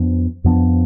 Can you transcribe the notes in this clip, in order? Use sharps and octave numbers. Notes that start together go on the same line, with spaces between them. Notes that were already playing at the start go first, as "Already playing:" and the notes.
Already playing: F2 F3 B3 D4
F2 F3 B3 D4